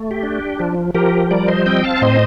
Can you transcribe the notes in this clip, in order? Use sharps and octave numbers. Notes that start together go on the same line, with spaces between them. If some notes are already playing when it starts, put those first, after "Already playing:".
Already playing: A3
G4
D4
F3
F3 G4 A#4
G3 A#4 D5
C5 D#5
C4 D#5 G5
F5 A5
A2 C5 D#5